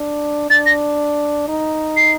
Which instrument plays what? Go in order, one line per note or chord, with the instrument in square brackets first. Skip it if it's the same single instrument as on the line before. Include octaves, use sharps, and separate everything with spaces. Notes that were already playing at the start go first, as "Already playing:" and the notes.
Already playing: [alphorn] D4
[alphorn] D4 [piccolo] A6
[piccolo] A#6
[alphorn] D#4
[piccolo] C7